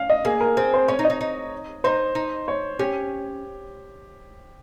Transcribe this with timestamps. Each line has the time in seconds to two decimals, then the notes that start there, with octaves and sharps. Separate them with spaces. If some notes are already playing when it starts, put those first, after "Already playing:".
Already playing: C#4 F5
0.10 D#5
0.25 A#3 G#4
0.41 A#4
0.57 C4 G#4
0.74 C5
0.88 C#4 C#5
0.99 D#4
1.05 D#5
1.10 D#4
1.21 D#4
1.84 D#4 C5
2.15 D#4
2.48 C#5
2.79 C#4 G4